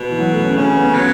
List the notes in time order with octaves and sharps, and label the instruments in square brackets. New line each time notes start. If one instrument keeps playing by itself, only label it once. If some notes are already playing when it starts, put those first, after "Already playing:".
Already playing: [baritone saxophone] B2
[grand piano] E3
F#3
A3
C#4
[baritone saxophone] C#3 [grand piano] C#4
[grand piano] B3
[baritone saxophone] F#3